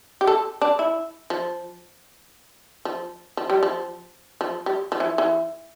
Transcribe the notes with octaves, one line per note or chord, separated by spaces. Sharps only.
G4
A4
D4
E4
F3
F3
F3
G3
F3
F3
G3
F3
E3
E3